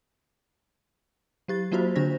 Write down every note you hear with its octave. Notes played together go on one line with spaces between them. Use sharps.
F#3 G4 A6
F#3 A#3 F4 F#4 C5
D3 D4 C5 A#6